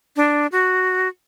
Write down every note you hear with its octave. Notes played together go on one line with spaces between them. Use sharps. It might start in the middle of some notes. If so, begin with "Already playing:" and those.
D4
F#4